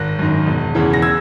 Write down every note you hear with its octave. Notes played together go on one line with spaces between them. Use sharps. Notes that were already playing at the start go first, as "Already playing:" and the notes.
Already playing: G#1 F#6 A#6
F#2 D#3
E1
E2 C#3 E3
A#6
E6 G#6